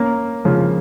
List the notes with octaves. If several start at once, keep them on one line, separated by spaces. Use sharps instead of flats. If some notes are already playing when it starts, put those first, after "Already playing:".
Already playing: A#3 C#4
C#3 F3